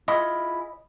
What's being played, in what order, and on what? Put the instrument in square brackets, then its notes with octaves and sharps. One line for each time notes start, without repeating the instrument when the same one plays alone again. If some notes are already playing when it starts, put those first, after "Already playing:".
[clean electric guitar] E4 F4 G#4 [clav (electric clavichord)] D#5